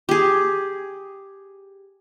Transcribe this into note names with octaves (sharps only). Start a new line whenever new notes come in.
G4 G#4